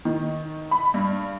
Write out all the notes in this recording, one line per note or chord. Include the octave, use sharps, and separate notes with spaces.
D#3
B5
G2